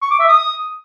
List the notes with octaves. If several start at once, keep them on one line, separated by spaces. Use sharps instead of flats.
C#6
D6
E5
D#6